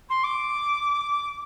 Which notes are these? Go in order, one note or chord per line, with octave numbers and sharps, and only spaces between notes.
C6
D6